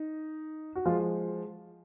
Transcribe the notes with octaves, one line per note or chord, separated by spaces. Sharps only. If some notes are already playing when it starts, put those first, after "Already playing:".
Already playing: D#4
F#4
F3 G#3 F4